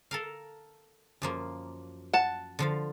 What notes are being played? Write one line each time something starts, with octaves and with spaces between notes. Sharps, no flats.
A4 A#4 F5
F#2 F3 A#3
F#5 A5
D3 F3 F5